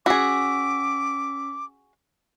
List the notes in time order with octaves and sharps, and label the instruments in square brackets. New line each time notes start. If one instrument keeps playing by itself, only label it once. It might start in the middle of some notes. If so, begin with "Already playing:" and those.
[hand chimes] C#4 E6 B6 [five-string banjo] F#4 G#4 [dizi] D6